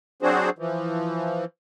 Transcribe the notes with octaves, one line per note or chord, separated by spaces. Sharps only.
F#3 C4 D4 F#4 G#4 C5
E3 F3